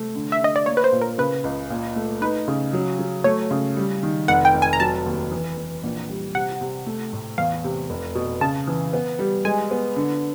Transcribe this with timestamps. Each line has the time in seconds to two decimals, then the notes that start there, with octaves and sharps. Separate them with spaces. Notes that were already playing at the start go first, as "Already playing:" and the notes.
Already playing: C3 A3
0.15 D3
0.32 E5
0.41 D3 D#5
0.56 D5
0.66 A#3 C#5
0.77 B4
0.84 C5
0.92 A#2
1.02 A#4
1.18 C#3 B4
1.44 C#2
1.70 A#2
1.96 A3
2.22 D#4 B4
2.48 C#3
2.73 F#3
2.99 F#3
3.24 A3 C#5
3.51 C#3
3.77 G3
4.03 D#3
4.28 F1 F#5
4.45 G5
4.54 F1
4.62 G#5
4.73 A#5
4.80 F#3 A5
5.06 D#2
5.32 E3
5.57 E3
5.83 A#1
6.09 G3
6.35 C3 F#5
6.61 C3
6.86 A3
7.13 A2
7.38 E2 F5
7.64 C3
7.90 F1
8.15 B2
8.41 C#3 A5
8.68 E3
8.93 B3
9.19 G3
9.45 G#3 G#5
9.71 B3
9.96 D3